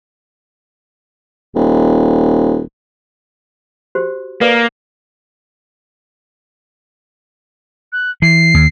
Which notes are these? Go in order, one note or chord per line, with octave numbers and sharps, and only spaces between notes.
D#1
F#4 G4 C5
A#3 A4 B4 D5
F#6
E3 C7
D#2